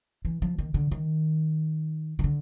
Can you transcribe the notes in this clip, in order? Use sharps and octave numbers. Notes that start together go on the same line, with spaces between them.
E3
F3
D#3
D3
D#3
D#3
D3